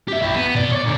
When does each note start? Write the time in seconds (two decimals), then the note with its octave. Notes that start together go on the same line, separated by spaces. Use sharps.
0.08 G4 E5
0.22 E4 G4
0.35 B3
0.55 B2 D5
0.72 C#5 D5
0.84 A#2 D3